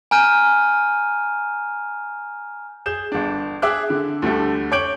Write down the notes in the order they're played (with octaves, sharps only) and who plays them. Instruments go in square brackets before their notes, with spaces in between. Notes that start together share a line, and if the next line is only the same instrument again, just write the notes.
[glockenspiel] G#5 A#5 F6 G6 D#7
[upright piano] G#4 G6 E7
G1 D4
G#4 E5 G5 D6 E6 F#6
D3
D2 D3 G3 A3
C#5 D6 G6 D7 F#7